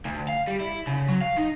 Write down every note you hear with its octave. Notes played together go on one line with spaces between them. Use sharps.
D2
F5
G3
E4
C#3
F#3
F5
D#4